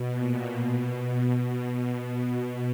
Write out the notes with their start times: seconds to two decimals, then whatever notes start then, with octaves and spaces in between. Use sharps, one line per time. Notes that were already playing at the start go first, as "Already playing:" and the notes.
Already playing: B2
0.13 A#2
0.52 B2
0.92 B2